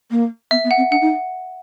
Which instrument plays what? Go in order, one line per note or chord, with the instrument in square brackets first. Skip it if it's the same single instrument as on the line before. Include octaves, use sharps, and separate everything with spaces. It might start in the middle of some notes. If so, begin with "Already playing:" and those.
[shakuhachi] A#3
[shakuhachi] B3 [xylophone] E5
[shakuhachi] B3
[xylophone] F#5
[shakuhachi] C4
[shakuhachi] D4 [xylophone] F#5
[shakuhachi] D#4